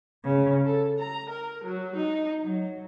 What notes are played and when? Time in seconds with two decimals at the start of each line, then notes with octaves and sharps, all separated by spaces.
0.24 C#3
0.65 A4
0.99 A#5
1.31 A#4
1.66 F#3
1.97 D#4
2.43 F#3